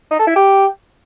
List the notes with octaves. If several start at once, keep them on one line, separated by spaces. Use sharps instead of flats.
D#4
A4
E4
G4